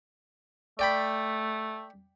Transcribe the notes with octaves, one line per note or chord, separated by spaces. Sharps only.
A3 D5 G5 B5